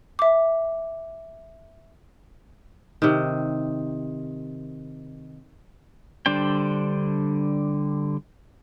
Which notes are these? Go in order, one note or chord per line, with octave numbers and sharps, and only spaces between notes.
E5 D6
C3 D#3
D3 G3 D4 C5 G5